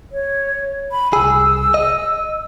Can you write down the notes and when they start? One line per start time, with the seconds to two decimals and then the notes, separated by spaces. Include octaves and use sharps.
0.12 C#5
0.92 B5
1.13 C2 G#4 E6
1.74 D#5